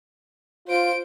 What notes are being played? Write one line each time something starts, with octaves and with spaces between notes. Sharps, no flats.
F4 C5 D7